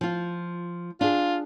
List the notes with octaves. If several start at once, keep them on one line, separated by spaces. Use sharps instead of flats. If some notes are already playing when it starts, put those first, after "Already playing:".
F3 F4
D4 F4 G#4